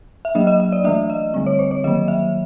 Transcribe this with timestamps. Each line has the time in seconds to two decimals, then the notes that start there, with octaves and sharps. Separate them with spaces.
0.25 E5
0.35 F#3 A#3 D4 D#5
0.47 D#5
0.60 D#5
0.72 D5
0.84 E3 A3 D4 E5
1.10 D#5
1.34 D3 G3 C4
1.46 C#5
1.59 C5
1.71 C#5
1.84 D#3 F#3 A#3 D#5
2.08 E5